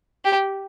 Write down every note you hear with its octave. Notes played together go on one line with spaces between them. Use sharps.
G4